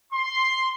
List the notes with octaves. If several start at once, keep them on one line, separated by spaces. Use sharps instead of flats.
C6